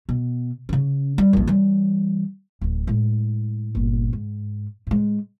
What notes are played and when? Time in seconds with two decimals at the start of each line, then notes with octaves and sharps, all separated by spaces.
0.09 B2
0.69 C#3 C#4
1.18 G3
1.33 A#1 F2
1.47 E3 G3
2.61 D1 E3
2.87 A2 G#3
3.75 G1 A#2
4.13 G#2
4.87 A2 G#3